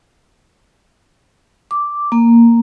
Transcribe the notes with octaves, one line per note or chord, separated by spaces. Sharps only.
D6
A#3